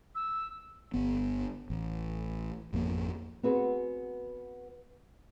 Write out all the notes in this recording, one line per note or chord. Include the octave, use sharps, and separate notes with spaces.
E6
G1 B3
A1
G#1 F2 D3 A#3
B3 C4 F#4 G#4 B4